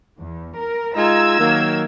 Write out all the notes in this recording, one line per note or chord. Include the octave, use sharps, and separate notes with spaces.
E2
A#4
G#3 D#4 F4 A#5 E6 G#6
D#3 F#3 A#3